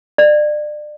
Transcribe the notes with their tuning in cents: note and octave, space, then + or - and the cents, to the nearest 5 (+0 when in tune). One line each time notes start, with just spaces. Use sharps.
D5 +30